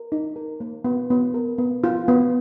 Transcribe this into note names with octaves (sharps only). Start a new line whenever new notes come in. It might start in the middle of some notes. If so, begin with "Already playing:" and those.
Already playing: A#4
D#4
A#4
A#3
B3
B3
A#4
B3
F4
B3